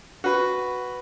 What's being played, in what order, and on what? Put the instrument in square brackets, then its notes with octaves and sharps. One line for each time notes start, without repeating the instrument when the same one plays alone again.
[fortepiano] F#4 B4